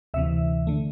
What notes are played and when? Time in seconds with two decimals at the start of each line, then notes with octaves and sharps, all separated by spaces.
0.14 D2 C3 E3 E5
0.67 D3 A3